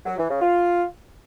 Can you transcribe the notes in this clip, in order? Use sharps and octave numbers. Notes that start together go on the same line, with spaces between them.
F#3
E3
C#3
F4